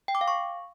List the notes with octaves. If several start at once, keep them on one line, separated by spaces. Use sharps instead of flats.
G5
D6
F5
C#6